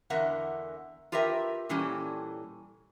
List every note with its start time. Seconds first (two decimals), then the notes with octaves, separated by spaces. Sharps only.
0.10 E2 D3 A#4 E5 F#5
1.12 F4 G4 A#4 B4 E5 G5
1.69 A#2 E3 G3 C#4 G4 A4